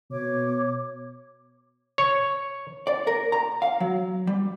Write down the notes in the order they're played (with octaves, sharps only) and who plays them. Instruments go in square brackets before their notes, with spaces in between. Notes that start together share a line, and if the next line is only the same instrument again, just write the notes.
[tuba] B2 [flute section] C#5 D6
[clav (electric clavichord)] C#5
[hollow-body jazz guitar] D5
A#4
A#5
F5
F#3
G3